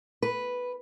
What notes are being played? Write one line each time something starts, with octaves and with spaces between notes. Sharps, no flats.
B4